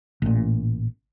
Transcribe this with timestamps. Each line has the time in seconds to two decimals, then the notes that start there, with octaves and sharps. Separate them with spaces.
0.22 A1 A#2